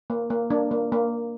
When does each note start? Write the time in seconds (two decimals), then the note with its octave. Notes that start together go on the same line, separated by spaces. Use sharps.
0.10 A#3
0.30 A#3
0.50 A#3 D4
0.71 A#3
0.92 A#3